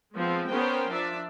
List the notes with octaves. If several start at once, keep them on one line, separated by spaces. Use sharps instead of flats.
F3 G#3 B3 C4
B3 C#4 A#4 C5 G5
F3 D4 D5 E5